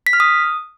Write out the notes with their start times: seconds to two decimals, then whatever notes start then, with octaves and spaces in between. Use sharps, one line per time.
0.07 B6
0.13 F6
0.20 D#6